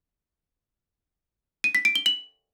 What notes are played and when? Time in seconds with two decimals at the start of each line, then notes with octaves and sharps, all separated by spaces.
1.64 D#7
1.75 B6
1.85 D7
1.95 G7
2.06 F#7